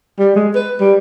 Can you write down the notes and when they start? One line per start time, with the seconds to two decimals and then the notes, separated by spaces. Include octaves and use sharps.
0.19 G3
0.36 G#3
0.55 B4
0.80 G3